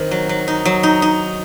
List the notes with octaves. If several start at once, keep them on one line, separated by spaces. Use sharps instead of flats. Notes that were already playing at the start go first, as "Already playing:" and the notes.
Already playing: D#3 C4
F#3
F#3
D#4
F#3
D#4
D#4